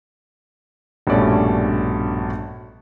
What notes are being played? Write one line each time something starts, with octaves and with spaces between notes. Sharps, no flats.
A#1 G2 B2 A3 C#4 D5